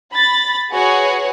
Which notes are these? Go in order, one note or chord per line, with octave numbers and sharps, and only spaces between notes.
B5 A6
F#4 G#4 B4 C#5 F#5 G#5